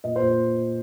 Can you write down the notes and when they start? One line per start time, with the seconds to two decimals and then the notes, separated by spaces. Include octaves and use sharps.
0.04 A#2 D#5
0.16 C5
0.21 A#2